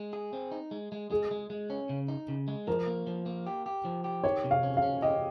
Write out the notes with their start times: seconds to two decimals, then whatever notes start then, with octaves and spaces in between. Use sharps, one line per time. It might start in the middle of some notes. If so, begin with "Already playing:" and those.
Already playing: G#3
0.13 G#4
0.33 C4
0.52 D#4
0.71 G#3
0.92 G#3
1.11 G#3 G#4
1.31 G#3
1.50 G#3
1.70 C#4
1.89 C#3
2.08 D#4
2.28 C#3
2.48 G#3
2.67 F3 A#4
2.87 A#3
3.07 F3
3.26 A#3
3.46 G4
3.66 G4
3.85 F3
4.04 G4
4.24 D#3 C#5
4.44 C3
4.51 F5
4.63 C#4
4.77 F5
4.82 C#4
5.02 G4 D#5